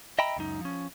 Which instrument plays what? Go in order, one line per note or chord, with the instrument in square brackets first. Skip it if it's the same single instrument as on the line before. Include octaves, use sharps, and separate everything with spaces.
[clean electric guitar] D#5 E5 G5 A#5 B5
C#2 F#2 D#4
F3 C#4